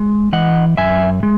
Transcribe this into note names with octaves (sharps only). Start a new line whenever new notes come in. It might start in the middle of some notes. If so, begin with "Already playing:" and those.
Already playing: G#3
E3 D#5 F#5
F#2 E5 G#5
G#3